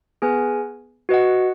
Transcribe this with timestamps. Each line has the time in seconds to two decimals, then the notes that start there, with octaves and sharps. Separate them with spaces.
0.22 B3 G#4 B4 G#5
1.09 F#4 B4 D#5 F#5